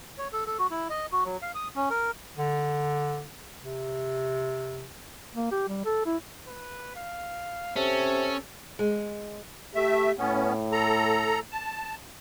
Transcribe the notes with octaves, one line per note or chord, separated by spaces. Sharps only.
C#5
A4
A4
F#4
E4
D#5
F#4
F#3
F5
D#6
C#4
A#4
D3
C3
A#3
G4
G3
A4
E4
B4
F5
C3 C#4 A4
G#3
A3 G4 E5
A2 B3 C#4
A4 A#5
A5